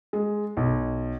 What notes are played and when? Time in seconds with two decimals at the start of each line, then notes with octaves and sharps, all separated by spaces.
0.13 G#3
0.57 B1